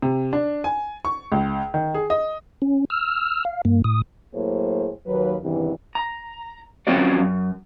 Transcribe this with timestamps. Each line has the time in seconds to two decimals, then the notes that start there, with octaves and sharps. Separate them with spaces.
0.02 C3
0.33 D4
0.64 G#5
1.05 C#6
1.32 C#2
1.74 D#3
1.95 G#4
2.10 D#5
2.62 C#4
2.90 E6 F6
3.45 F5
3.65 G2 A#3
3.84 A2 D#6
4.34 A2 F#3 A#3 G#4 C5
5.06 D#2 F#3 B4
5.42 E2 G2 C3 D#3 E3
5.95 A#5
6.87 F#3 C4 C#4 F4 F#4 D5
7.20 F#2